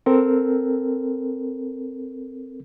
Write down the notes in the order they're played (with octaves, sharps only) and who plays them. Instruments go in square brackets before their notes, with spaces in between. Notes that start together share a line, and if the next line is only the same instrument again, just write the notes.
[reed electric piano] C4 A4 A#4